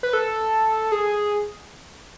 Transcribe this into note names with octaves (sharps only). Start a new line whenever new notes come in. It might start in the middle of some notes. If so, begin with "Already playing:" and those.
B4
A4
G#4